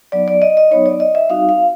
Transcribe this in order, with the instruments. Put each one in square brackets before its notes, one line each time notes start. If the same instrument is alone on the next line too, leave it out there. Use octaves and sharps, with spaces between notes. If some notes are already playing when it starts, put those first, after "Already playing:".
[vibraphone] F#3 B3 D#4 D5
D5
D#5
D#5
F#3 B3 D#4 C#5
D5
D#5
E5
G3 C4 D#4 F#4 F5
F5